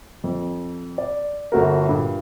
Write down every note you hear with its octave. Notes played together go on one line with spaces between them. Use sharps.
F2
D5
G1 A3 F#4 A#4
G2 A#2